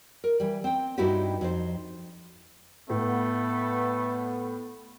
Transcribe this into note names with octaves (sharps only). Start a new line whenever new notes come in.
A#4
E3 G3
C4 G5
G2 C4 D#4 E4 F#4 G4
F2 D#4 C5
A2 A3 B3